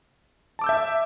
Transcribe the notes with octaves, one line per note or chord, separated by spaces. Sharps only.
E5 A5 D6 E6 G6